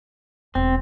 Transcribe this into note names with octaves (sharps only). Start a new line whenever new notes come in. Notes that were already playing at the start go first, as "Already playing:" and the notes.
E1 C4